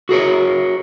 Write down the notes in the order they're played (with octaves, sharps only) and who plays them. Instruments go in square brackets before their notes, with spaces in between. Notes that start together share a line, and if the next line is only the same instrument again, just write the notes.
[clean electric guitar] F#4 G#4 A#4 C#5